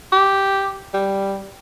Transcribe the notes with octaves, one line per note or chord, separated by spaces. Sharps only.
G4
G3